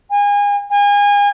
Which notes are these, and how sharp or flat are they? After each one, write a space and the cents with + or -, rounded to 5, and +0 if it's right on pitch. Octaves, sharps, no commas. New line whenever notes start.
G#5 -30
G#5 -35